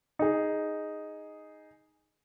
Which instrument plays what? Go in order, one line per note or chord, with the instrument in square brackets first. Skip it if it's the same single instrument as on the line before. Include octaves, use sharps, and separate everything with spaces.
[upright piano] D#4 G#4